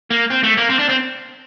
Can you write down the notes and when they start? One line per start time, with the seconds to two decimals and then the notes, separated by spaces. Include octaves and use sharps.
0.10 A#3
0.30 C4
0.43 A3
0.57 A#3
0.69 C4
0.79 D4
0.89 C4